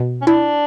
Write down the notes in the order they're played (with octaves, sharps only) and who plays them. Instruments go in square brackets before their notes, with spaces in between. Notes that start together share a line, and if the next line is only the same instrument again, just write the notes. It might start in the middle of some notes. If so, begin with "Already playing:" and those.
Already playing: [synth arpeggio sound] B2
[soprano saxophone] C#4
[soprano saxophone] D4 [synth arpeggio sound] E4